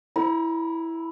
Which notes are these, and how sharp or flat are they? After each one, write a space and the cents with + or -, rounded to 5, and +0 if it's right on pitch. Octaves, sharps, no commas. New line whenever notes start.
E4 +0 A#5 +35